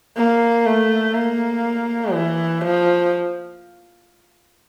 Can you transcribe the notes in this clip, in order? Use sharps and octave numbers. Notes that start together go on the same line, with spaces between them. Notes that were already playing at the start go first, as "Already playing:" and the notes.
A#3
A3
A#3
E3
F3